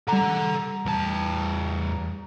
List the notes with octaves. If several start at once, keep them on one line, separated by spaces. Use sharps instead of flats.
G3 A4 F#5 A#5
E2 A5